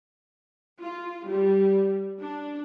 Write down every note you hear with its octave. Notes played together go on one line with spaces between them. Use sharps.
F4
G3
D4